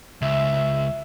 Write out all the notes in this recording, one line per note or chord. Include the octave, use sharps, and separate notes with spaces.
C#2 E5